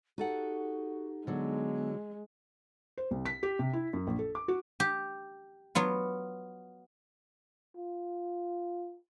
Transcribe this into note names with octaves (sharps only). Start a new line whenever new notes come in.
D#4 F#4 G4 A4 F#5
D3 F#3 G#3 B3
C5
C2
B6
G4
C3
E4
F#2
A#1
A4
D6
F#4
G4
F#3 B3 F4
F4